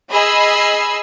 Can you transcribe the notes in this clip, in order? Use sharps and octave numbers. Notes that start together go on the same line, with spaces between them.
G#4 D#5 G#5 B5 E6 C7